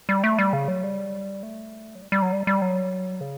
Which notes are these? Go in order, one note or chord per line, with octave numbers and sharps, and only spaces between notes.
G3
A3
G3
C#3
F#3
G3
A3
F#3
G3
G3
F#3
G3
G3
F#3
C#3